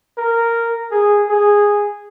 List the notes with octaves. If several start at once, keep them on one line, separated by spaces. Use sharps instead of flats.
A#4
G#4
G#4